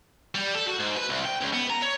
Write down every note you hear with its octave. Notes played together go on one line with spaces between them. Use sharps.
G3
A4
F#4
G#2
B4
C2
G5
C#2
B3
A#5
C#5